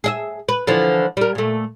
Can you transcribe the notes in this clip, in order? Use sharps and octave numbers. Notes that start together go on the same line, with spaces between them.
G#4 D#5 E5
B4
D3 E3 F3
G3 A#4
A#2 A3